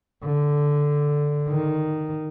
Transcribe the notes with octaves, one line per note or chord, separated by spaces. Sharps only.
D3
D#3